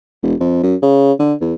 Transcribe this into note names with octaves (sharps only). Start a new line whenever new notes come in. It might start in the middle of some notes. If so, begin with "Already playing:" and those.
E1
F2
F#2
C#3
D3
E2